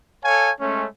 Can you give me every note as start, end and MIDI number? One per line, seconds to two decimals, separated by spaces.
0.24 0.51 69
0.24 0.51 73
0.24 0.51 77
0.24 0.51 80
0.60 0.86 56
0.60 0.86 57
0.60 0.86 61